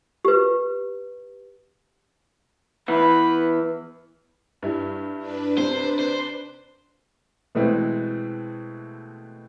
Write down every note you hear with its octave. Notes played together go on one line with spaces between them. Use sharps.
G4 B4
E3 B3 B4
G2 E4
D4 B4
C3 C5
C5
B2 E3 G#3 A3 C4